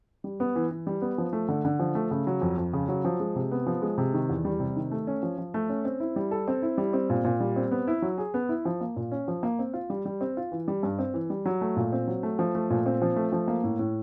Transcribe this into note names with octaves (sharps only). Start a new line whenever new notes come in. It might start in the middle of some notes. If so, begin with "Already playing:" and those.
G3
B3
E3
E3
G3
B3
F3
A3
D3
D3
F3
A3
C#3
F#3
F2
F2
C#3
F#3
F3
G#3
C3
B3
F3
G#3
C3
D#3
E2
G3
C3
D#3
A3
C#4
F3
F3
A3
C#4
C4
E4
G3
A4
C4
E4
G3
C4
A#2
A#2
G3
C4
B3
E4
F#3
G#4
B3
E4
F3
A#3
A#2
C#4
F3
A#3
C4
F4
G3
G3
C4
F4
E3
G3
G2
C4
E3
G3
F#3
A3
A#2
C4
F#3
A3
F3
A3
A#2
C4
F3
A3
F3
A#3
A2
A2